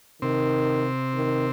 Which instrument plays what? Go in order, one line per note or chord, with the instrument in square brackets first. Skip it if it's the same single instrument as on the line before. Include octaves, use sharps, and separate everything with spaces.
[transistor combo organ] C3 C4 [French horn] D#3
[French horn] D#3